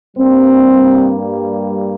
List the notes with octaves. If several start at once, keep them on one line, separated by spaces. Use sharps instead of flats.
G2 G3 A#3 C4